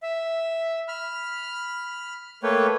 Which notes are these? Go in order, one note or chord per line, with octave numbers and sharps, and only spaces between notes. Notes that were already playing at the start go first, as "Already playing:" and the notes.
E5
B5 F6
A3 A#3 B4 C#5 G5